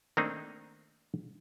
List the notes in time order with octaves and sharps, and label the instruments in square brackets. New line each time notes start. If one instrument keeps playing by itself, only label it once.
[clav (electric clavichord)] D#3 A3 A#3 C4 D4 D#4